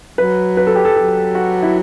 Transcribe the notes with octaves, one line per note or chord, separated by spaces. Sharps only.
F#3 B4
B4
A4
G4
A4
F#3 A4
F#4
E4